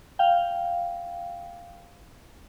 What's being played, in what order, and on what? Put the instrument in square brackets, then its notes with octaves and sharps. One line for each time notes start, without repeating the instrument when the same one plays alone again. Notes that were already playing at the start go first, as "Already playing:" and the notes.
[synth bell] F5 G5